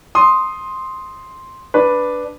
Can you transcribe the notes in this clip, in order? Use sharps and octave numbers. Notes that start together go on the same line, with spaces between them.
C6 D#6
D4 B4